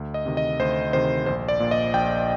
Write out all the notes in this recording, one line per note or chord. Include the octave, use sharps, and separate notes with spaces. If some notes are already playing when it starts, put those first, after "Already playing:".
Already playing: D2
D#5
C3 D#3
D#5
D2 C5
C3 D#3 C5
A#1 C5
D5
A#2
D#5
A#1 G5